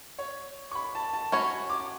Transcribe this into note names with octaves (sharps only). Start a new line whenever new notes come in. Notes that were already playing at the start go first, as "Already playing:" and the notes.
C#5
C#6
B5
A5
A5
C#4 F#4 C#5 B5
D6